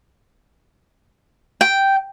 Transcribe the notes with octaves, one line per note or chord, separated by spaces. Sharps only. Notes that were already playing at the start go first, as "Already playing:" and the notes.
G5